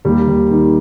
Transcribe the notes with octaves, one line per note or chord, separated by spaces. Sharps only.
D#2 G3
D#2
D#3